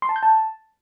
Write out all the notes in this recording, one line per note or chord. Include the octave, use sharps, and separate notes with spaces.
C6
A5
G6
A5